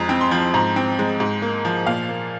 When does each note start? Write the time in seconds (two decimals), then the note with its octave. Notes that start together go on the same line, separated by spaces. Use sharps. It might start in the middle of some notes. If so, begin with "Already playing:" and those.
Already playing: F2 G#3 A#5
0.09 C4
0.21 C6
0.31 F3
0.54 G#2 A#5
0.76 C4
0.99 G#3
1.20 G#2
1.42 A#3
1.65 F3
1.87 A#2 F5
2.09 A#3